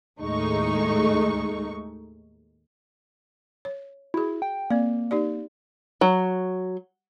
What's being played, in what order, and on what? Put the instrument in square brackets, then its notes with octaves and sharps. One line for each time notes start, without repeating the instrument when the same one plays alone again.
[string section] D#2 A2 G#3 A3 D#4 C#6
[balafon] C#5
[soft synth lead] E4 [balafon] F#4 G#4
[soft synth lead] G5
[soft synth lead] A#3 [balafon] C4 D5
[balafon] D#4 G4 D5
[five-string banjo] F#3